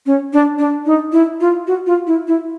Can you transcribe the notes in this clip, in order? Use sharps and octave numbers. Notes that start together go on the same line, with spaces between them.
C#4
D4
D4
D#4
E4
F4
F#4
F4
E4
E4